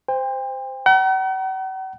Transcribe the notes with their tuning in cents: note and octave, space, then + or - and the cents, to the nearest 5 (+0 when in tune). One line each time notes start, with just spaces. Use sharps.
C5 -10 G5 +35
F#5 +45 A#5 +30